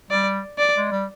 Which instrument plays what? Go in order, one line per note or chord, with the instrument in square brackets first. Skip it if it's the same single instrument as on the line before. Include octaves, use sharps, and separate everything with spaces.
[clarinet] G3 [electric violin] D5
[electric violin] D5
[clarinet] G#3
G3